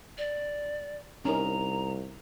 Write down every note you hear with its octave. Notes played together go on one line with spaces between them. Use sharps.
D5
C2 C#4 D#4 A#4 A#5